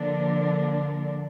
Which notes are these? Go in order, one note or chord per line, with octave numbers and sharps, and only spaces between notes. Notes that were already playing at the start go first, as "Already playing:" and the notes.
Already playing: D3 F3 A#3 D4